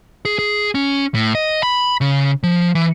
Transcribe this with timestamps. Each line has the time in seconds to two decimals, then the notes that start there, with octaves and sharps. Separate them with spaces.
0.25 G#4
0.39 G#4
0.75 C#4
1.14 A2
1.35 D#5
1.63 B5
2.01 C#3
2.43 F3
2.75 E3